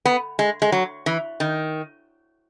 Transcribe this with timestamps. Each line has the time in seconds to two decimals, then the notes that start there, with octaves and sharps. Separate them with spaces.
0.05 B3
0.39 G#3
0.62 G#3
0.72 F#3
1.06 E3
1.40 D#3